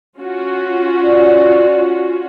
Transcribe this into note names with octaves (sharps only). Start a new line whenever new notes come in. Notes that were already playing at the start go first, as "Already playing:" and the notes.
C#4 F4 F#4
D5